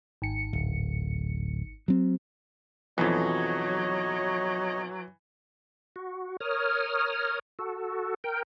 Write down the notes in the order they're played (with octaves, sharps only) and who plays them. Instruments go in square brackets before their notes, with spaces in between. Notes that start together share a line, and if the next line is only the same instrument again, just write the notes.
[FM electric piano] G#1 C#7
[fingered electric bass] D1
F#3 C4
[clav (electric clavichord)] B1 F2 [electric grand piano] E3 [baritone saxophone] F#3 [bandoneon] C#5 D#5
[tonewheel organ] F#4
A#4 C#5 D#6 F6
F#4 A4
A#4 G5